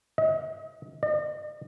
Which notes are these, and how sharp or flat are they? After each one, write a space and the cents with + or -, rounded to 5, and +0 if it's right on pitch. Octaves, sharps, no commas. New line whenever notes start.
D#5 +35
D#5 -45